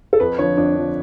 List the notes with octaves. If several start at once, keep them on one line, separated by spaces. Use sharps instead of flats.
A4
F2 B4
D3 F3 C#5
F2 D4
D3 F3